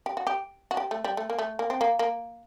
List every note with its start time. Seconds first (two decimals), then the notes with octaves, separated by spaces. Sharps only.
0.06 G4
0.17 F#4
0.27 G4
0.71 F#4
0.77 G4
0.91 A3
1.04 G3
1.17 A3
1.30 A#3
1.39 A3
1.59 A#3
1.70 C4
1.81 A#3
1.99 A#3